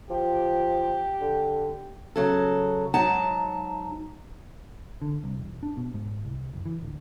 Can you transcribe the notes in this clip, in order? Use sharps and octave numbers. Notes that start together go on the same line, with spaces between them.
F3 G4
D3
C#3 F#3 A4
G#2 F#3 D#4 F#5 A5 A#5
D3
C2
E1
D4
B2
G#2
C2
F#1
E3
D1